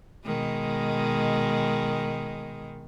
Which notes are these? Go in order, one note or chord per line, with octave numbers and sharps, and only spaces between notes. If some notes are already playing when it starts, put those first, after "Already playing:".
B2 D#3 G#3